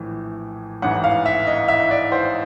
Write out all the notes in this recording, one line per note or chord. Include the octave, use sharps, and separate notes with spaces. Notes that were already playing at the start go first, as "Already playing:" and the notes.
Already playing: A#1 A2 E3
A1 G#2 E3 F#5
F5
E5
D#5
E5
D5
C5